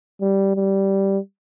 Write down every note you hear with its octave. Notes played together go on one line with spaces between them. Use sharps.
G3
G3